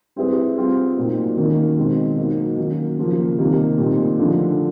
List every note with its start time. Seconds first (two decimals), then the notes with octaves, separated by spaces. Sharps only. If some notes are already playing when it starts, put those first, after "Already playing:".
0.16 G3 C4 E4 G#4 B4
0.57 G3 C4 F4
0.97 A#2 F#3 A#3 D#4
1.37 D#3 F#3 A#3 C#4
1.78 B2 G#3 C4 D#4
2.17 F#3 A#3 D#4
2.57 D#3 F#3 A#3 C#4
2.98 C#3 F3 A#3
3.38 C3 D#3 G3 A#3 D#4
3.78 A#2 G3 C4 D#4
4.19 D3 F3 A3 D4